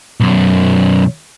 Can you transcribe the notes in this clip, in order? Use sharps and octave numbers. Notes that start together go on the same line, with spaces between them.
B1 F#2